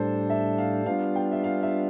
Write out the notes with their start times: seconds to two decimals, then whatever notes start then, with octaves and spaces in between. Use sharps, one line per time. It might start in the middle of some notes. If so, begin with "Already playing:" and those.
Already playing: A2 G3 D4 A4 C5
0.30 E5
0.58 F5
0.86 G3 B3 D4 F4 F5
1.16 G5
1.32 E5
1.44 F5
1.62 E5